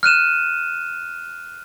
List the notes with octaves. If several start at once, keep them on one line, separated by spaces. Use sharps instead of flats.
F6 F#6 D#7 E7